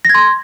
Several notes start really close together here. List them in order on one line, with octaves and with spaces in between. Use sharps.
A#6 G#6 C6